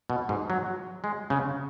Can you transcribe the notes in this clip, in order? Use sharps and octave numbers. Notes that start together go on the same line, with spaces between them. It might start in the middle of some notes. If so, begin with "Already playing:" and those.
B2
G#2
F#3
G#3
C#3